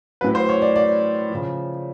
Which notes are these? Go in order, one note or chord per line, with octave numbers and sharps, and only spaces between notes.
A2 F#3 B4
C5
C#5
D5
D5
C#3 F3